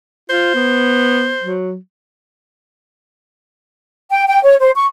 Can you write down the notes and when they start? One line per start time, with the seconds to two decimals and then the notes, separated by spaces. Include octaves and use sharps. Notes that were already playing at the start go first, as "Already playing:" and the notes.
0.30 F4 C5
0.55 B3
1.43 F#3
4.10 G5
4.28 G5
4.43 C#5
4.60 C5
4.75 C#6